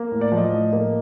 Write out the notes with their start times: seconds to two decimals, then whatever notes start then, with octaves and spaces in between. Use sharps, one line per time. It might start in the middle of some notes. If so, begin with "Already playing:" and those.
Already playing: A#3
0.12 A2
0.21 D5
0.32 F3
0.37 D#5
0.53 A2
0.73 A#3